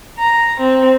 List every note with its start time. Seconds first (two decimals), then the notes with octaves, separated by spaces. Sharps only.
0.18 A#5
0.61 C4